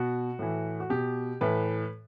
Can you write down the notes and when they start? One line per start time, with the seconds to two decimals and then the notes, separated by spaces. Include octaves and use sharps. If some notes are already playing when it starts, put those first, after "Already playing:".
Already playing: B2 F#4
0.39 A2 E3
0.80 F#4
0.90 B2 G4
1.41 A2 E3 B4